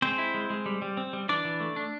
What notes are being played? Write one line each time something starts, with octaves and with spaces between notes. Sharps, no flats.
G#3 C4 C5
E4
G#3
G#3
G3
G3
C4
G3
E3 D4 D5
E3
A3
D4